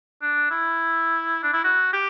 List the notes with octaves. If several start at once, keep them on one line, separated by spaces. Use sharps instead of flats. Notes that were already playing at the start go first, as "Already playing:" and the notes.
D4
E4
D4
E4
F#4
G4